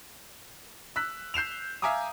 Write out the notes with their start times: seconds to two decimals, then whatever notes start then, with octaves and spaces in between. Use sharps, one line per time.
0.96 E6 F#6 B6
1.34 G6 C7 E7 F7
1.82 E5 F5 G#5 A#5 D6 D#6